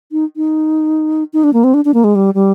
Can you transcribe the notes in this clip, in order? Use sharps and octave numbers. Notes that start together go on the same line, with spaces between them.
D#4
D#4
D#4
D4
A#3
C4
D4
D4
A#3
G#3
G3
G3